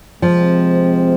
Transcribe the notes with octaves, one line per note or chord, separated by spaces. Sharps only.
C3 F3 G#3 C4